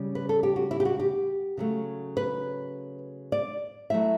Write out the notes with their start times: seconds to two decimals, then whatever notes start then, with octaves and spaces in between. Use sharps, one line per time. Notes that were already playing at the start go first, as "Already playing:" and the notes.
Already playing: C#3 G3
0.15 B4
0.29 A4
0.43 G4
0.56 F#4
0.71 E4
0.80 G4
0.85 F#4
1.00 G4
1.57 C#3 F#3 A3
2.17 B4
3.32 D5
3.90 F#3 A3 E4 E5